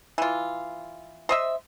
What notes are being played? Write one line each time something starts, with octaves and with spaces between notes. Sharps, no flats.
E3 F4
C5 D#5 E5